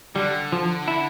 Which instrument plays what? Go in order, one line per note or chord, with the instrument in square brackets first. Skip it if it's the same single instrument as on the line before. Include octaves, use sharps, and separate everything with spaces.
[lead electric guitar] D3 [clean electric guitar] G3
[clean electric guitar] F3
E4